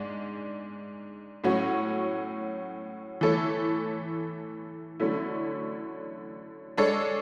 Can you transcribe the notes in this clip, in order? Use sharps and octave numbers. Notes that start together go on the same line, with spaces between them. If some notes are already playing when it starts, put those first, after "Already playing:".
Already playing: G#2 G#3 D4
A2 F#3 C#4 F#4 C#5
E3 A3 E4 A4 C#5
D3 F#3 A3 C#4 E4
G#3 D4 A4 C#5